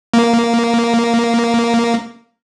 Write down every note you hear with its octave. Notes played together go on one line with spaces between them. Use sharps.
A#3